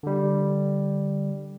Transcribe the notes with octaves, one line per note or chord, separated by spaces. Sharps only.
D3 G3